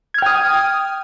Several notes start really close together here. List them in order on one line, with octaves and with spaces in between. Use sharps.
G#6 F6 G5 D#6